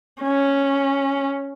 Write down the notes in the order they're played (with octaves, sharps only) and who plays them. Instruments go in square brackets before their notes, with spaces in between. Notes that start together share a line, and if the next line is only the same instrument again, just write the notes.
[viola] C#4